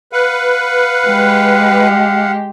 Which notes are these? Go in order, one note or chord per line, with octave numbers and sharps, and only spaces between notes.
B4 F5 F#5
G#3 G4